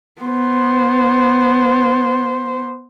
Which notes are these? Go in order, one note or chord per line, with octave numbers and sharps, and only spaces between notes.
B3 C5